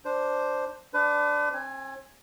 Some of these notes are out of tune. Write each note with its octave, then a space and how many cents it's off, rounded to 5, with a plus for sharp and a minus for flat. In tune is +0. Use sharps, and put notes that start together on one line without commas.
D4 +0 C5 +0
D4 +0 B4 +40
C4 +40 G#5 +0